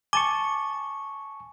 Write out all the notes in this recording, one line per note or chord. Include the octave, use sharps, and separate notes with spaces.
G#5 A5 C#6 D6